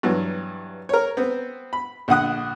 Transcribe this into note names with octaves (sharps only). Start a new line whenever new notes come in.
G2 E3 F#3
A#4 C#5
B3 C4
B5
A#1 D3 F#5 D#6 F#6